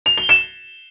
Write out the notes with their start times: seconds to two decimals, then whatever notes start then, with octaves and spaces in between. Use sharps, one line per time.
0.06 F7
0.18 G7
0.29 E7